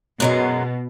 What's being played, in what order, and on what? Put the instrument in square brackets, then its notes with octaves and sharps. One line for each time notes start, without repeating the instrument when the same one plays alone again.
[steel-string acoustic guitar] F#2 F#3 G#3 [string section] B2